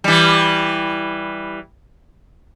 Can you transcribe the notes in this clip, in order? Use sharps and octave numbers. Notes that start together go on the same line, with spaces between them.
E3 G3